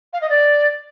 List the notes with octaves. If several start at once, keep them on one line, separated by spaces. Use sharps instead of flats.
F5
D#5
D5